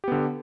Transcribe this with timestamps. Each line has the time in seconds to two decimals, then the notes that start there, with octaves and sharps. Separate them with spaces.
0.04 G4
0.08 B3
0.12 D3